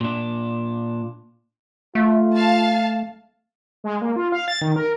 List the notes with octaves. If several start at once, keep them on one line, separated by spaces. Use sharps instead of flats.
A#2 D4
A3 F4
F5 A5
G#3
A#3
F4
F5
A6
D#3
A#4